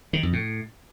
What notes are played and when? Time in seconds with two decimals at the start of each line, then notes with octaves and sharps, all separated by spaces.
0.13 D#3
0.23 F2
0.33 A2